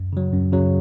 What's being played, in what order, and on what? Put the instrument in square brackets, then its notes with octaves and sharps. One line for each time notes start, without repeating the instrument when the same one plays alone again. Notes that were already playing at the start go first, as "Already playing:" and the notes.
Already playing: [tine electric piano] F#2
C#3 F#3
F#2
C#3 F#3